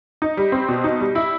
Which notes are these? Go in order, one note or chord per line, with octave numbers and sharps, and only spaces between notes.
D#4
G3
C4
B2
D#4
G3
E4